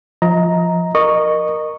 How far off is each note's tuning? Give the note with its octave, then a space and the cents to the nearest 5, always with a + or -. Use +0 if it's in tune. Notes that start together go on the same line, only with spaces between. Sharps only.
F3 +0 D#5 +30 A#5 +0
A#4 +0 D#5 -25 C#6 +0